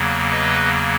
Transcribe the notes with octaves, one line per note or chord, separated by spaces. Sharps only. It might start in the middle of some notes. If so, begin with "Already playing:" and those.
Already playing: E2 C#3 F#3 A#3
B4 D#5